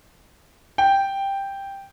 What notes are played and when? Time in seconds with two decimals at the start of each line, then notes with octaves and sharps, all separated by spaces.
0.78 G5